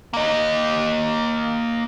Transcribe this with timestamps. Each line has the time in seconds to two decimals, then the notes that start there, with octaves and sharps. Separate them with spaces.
0.13 A#3 D#5